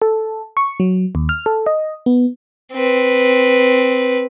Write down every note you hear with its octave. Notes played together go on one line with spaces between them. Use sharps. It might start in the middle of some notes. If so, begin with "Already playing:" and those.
A4
C#6
F#3
D#2
F6
A4
D#5
B3
C4 B4